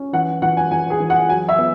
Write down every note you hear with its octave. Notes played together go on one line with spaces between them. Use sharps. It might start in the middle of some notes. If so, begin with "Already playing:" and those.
Already playing: C#4
E3 F#5
E3 F#5
G#5
E3 G#5
G#4
E3
F#5
F#3 G#5
E5
B3